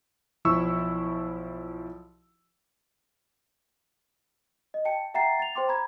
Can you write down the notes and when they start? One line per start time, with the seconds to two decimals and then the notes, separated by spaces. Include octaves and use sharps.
0.45 B1 F3 E4 C#6 E6
4.74 D#5
4.85 G5 A5 C#7
5.14 E5 F#5 G5 A#5 A6 C7
5.39 A6 F7
5.55 C5 G5 C6 D6
5.68 A#5 B5 G#6